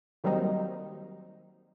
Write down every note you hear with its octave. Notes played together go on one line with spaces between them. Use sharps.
D#3 F#3 G3 A#3 C4 D#4